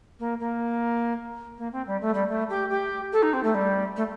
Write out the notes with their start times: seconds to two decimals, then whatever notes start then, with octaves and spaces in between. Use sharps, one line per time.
0.19 A#3
0.39 A#3
1.58 A#3
1.72 C4
1.87 G3
2.01 A3
2.14 G3
2.28 A3
2.49 G4
2.70 G4
3.12 A4
3.22 D#4
3.33 C4
3.43 A3
3.54 G3
3.96 A3